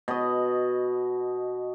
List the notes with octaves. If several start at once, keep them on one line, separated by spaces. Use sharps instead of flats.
B2 D#5